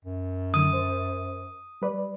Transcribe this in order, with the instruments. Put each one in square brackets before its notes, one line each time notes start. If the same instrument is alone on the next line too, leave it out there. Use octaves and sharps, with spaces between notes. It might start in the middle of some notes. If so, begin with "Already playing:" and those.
[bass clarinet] F#2
[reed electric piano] D3 D#3 F#3 [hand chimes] D#6
[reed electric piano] C5
G3 B4 D5